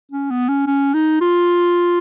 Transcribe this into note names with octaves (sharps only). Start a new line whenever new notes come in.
C#4
B3
C#4
C#4
D#4
F4